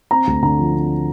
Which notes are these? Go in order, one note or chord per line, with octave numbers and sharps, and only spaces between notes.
C4 A#5
D2
D3 A#5
F3
C4